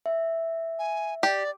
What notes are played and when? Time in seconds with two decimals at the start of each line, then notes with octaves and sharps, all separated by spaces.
0.06 E5
0.79 G#5
1.23 G4 D5